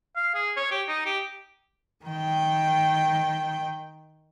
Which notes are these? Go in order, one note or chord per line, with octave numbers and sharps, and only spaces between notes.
F5
G#4
C#5
G4
D#4
G4
D#3 G5